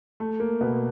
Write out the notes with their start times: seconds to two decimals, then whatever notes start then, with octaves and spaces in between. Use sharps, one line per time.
0.20 A3
0.40 A#3
0.61 B2 B3